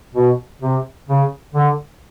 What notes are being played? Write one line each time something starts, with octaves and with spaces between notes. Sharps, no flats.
B2
C3
C#3
D3